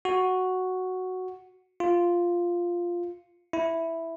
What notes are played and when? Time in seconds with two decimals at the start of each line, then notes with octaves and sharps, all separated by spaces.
0.05 F#4
1.80 F4
3.53 E4